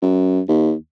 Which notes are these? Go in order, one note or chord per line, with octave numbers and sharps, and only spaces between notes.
F#2
D#2